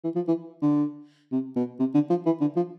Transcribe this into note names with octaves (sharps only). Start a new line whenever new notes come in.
E3
F3
E3
D3
C3
B2
C3
D3
F3
E3
D3
F3